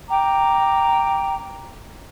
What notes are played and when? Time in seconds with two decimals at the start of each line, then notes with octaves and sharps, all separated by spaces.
0.08 G5 A#5 D6